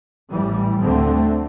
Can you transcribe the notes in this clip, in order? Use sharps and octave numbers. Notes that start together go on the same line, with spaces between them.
A1 A2 E3 G3
D2 D3 A3 C4